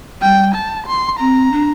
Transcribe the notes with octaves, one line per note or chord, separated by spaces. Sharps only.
G3 G5
A5
C6
C4 A#5
D4